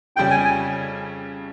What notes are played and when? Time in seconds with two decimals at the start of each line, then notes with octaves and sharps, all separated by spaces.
0.16 F2 C#3 G3 C#4 G5
0.31 G#5
0.45 G#5